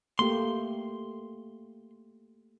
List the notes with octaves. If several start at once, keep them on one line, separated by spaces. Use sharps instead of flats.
A3 A#3 G4 C6